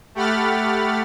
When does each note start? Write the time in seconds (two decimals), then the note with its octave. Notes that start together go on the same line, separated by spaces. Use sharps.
0.15 A3 G4 F#5 B5 F6 A6